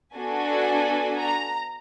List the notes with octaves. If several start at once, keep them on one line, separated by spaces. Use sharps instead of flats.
B3 D4 F#4 A4 G#5
A#5